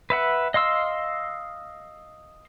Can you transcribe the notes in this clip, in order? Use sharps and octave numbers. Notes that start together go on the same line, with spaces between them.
B4 E5 F#5
D#5 F5 C6 E6